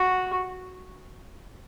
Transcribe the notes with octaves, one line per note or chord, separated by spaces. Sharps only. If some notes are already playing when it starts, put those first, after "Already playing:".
Already playing: F#4